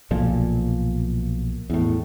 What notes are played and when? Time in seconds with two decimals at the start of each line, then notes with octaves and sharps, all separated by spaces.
0.11 B1 A#2 F3
1.70 E2 A2